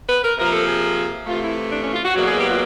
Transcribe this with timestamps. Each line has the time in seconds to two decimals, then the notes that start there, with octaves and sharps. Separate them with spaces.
0.08 B4
0.23 A#4
0.37 C3 F3 A#3 A#4
0.52 A4
0.67 G#4
1.26 C3 E3 A3 F4
1.41 E4
1.71 D4
1.82 C#4
1.92 F4
2.04 F#4
2.15 E2 B2 F#3 A#3 F#4
2.27 G#4
2.38 G4
2.48 F4